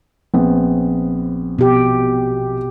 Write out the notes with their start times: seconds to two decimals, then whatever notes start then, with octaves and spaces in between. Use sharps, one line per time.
0.34 A#1 B3 C4
1.59 B2 G4